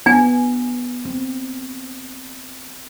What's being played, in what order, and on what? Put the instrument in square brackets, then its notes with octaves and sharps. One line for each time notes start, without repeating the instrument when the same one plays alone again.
[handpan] B3 [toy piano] D4 G#5
[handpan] C4